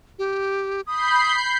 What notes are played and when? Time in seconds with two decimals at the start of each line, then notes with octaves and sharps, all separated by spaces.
0.19 G4
0.87 B5 D#6 G6 C7